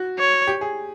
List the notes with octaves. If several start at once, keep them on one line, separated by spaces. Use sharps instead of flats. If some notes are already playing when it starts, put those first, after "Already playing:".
Already playing: F#4
C#5
G4
G#4